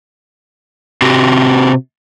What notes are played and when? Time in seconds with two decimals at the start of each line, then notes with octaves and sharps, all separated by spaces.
1.02 C3 C4 F#4 G4